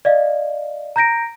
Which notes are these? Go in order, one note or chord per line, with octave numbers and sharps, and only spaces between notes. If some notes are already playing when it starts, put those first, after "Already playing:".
D5 D#5 F5
A#5 G6 A#6 D7